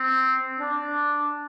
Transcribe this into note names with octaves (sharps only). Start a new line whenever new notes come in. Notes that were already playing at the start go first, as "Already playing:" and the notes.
Already playing: C4
D4